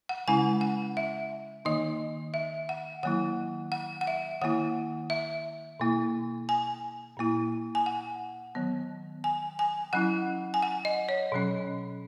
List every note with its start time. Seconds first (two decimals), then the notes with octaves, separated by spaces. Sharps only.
0.09 F#5
0.28 C#3 G#3 C#4 E4 G#5
0.61 F#5
0.97 E5
1.65 D#3 A#3 D#4 D#5
2.34 E5
2.69 F#5
3.03 D#3 F#3 A#3 E4 F#5
3.72 F#5
4.01 F#5
4.07 E5
4.42 D#3 A#3 E4 F#5
5.10 E5
5.80 B2 A#3 E4
6.49 G#5
7.17 A#2 A#3 E4
7.75 G#5
7.86 F#5
8.55 D#3 F#3 B3
9.24 G#5
9.59 G#5
9.93 F#3 C#4 E4 F#5
10.54 G#5
10.62 F#5
10.85 D#5
11.09 C#5
11.32 B2 F#3 C#4